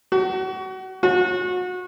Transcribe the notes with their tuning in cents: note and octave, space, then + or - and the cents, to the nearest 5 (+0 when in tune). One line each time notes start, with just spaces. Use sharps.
F#4 +30
F#4 -30